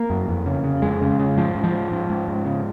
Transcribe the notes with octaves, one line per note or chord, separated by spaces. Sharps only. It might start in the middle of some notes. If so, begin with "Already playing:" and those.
Already playing: A#3
F#2
F2
C#3
C#3
F2 G#3
C#3
C#3
G#2 F3
G#2
F3
G#2
G#2
G#2
G#2
C#3